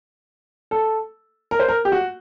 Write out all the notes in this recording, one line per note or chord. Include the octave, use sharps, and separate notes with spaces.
A4
A#4
C5
A#4
G4
F#4